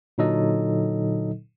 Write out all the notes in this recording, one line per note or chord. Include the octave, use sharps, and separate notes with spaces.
A#2 D3 F#3 D#4 A4 D#5